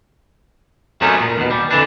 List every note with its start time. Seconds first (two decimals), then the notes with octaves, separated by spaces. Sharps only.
1.01 F#2 C3 A3 B3 C#4 D#4
1.21 A#2
1.38 D#2 B2
1.51 G3
1.71 F2 D3 E3 D4